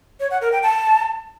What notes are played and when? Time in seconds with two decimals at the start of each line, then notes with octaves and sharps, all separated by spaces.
0.20 C#5
0.31 F#5
0.41 A#4
0.52 G5
0.63 A5